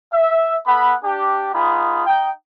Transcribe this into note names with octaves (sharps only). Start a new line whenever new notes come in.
E5
B3 A4 F#5 B5
D4 G4
B3 D#4 F4 G#4 B5
D#4 G5